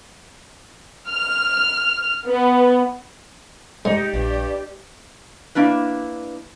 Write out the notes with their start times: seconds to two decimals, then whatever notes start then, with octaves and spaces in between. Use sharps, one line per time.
1.09 F6
2.27 B3
3.85 G#2 D#4 G4 D5
4.14 A#1 G2
5.55 A#3 D4 E4 B4